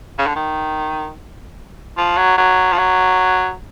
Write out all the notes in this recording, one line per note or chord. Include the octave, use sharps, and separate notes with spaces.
C#3
D3
D#3
F3
F#3
F#3
F3
F#3